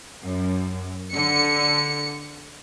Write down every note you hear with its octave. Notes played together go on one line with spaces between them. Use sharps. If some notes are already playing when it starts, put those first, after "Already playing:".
F#2
D3 C#7